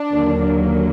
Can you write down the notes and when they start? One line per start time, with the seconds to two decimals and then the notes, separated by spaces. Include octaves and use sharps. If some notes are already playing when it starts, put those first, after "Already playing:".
Already playing: D4
0.11 D#2 D3 F#3 A#3